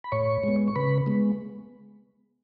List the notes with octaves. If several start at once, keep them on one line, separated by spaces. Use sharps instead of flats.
B5
A2 C#5 C#6
G#3 B3
C#6
C#3 B4 B5
G#3 B3